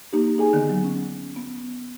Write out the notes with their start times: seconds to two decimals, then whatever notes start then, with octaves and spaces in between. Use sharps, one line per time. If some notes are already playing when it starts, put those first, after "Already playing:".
0.13 A#3 D#4 G4
0.38 D#4 G#4 G#5
0.53 D3 D#3 B3
0.70 F#3
0.84 C#4
1.36 B3